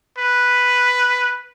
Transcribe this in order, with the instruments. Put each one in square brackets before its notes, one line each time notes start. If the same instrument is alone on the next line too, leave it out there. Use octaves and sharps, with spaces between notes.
[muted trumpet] B4